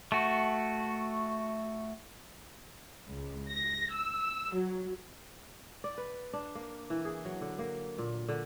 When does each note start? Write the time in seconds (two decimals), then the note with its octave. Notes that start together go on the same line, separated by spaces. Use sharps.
0.12 A3 F#4
3.08 C#2
3.50 A#6
3.92 E6
4.53 F#3
5.84 D5
5.98 B4
6.33 D4
6.55 A#3
6.90 E3
7.05 G#4
7.25 F#3
7.41 D3
7.59 A#3
7.98 A#2
8.29 D3